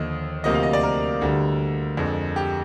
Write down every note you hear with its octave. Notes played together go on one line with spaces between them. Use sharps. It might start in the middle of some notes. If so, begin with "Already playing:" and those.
Already playing: D#2 D3 F3 D#5
D2 C3 F3 A#3 D#5
F5
D#5
D5
A#4
D2 D3 G3
F2 D3 G#3
G4